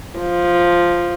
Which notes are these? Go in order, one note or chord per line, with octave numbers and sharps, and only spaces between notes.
F3